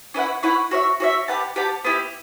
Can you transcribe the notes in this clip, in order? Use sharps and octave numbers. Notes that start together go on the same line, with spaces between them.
C#4 E4 B4 F#5
C#4 E4 B4 F#5
F#4 C#5 E5
F#4 C#5 E5
G4 B4 F#5 A5
G4 B4 F#5 A5
B3 E4 G4